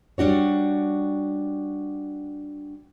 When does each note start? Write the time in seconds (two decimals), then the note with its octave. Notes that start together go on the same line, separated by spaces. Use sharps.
0.18 G3 D4 F#4 C#5